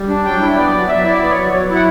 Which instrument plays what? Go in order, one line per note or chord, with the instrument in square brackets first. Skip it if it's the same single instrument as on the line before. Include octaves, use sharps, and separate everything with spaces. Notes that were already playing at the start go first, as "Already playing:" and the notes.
Already playing: [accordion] G3
D4
F#3 G5
E4
B3 D5
F#3
F#3 E5
E4
D5
B3
C#5
F#3
F#3
E4
F#5